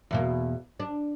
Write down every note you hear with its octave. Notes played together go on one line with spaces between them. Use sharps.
E2 B2 A#3
D4